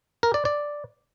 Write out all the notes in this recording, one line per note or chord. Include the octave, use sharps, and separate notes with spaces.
A#4
D5
D5